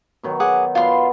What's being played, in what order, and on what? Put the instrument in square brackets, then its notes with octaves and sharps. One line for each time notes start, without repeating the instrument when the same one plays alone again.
[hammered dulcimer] B2 D#3 F#3
[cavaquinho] G#4 F#5 D6
[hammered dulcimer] B2 D5 B5 [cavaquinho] F4 C6